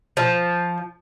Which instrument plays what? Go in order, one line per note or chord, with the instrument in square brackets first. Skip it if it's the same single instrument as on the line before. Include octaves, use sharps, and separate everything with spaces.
[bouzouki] F3